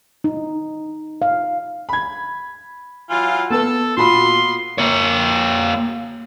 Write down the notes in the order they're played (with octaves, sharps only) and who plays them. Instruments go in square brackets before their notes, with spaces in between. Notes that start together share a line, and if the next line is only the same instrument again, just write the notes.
[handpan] D#4
F5
[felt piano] B5 G#6
[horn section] E3 F#3 F4
[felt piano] B3 B4 [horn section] A4
[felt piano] A#2 F#4 B5 [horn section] B3 F4 C6
[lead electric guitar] A#3 C#5